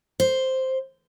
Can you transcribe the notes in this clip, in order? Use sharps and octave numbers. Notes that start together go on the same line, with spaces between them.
C5